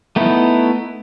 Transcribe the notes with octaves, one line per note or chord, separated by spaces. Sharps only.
A3 B3 D#4 E4